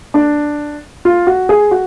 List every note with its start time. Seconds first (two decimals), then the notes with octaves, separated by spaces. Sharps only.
0.14 D4
1.05 F4
1.27 F#4
1.49 G#4
1.71 F#4